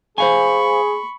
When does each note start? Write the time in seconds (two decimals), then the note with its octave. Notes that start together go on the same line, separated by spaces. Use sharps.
0.18 G#4 C5 F5 G#5 B5 C#6